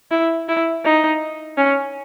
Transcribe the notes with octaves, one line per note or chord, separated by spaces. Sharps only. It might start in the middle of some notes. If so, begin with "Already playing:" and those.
E4
E4
D#4
C#4